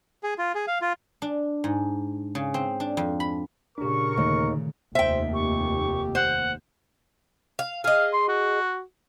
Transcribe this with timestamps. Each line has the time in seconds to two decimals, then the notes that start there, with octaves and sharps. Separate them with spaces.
0.23 G#4
0.38 F4
0.55 G#4
0.68 F5
0.82 F4
1.22 D4
1.64 G#2
2.35 C#3
2.54 C4
2.80 D4
2.97 F2
3.20 B5
3.78 A#2 C#3 D4 G4 A#4 C#6
4.17 D#2 D3 D#3 A3
4.95 F1 D#2 C5 E5 G5
5.34 G4 C#6
6.15 C5 F#5
7.59 F5
7.84 G#4 D#5 F5
8.13 C6
8.28 F#4